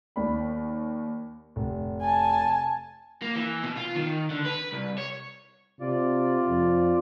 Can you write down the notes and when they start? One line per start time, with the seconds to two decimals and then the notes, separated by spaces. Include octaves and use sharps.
0.16 D#2 D5 B5
1.56 F1
2.01 G#5 A5
3.22 A#3
3.36 E3
3.63 B2
3.77 F4
3.96 D#3
4.31 D3
4.46 B4
4.73 C2
4.98 C#5
5.81 C3 F4 D5
6.49 F2